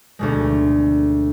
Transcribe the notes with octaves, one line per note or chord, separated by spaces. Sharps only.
D2 B2 G#3